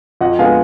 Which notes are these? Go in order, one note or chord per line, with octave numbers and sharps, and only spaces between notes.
F2 D#5 F#5
D3 G#3 B3 F5 G#5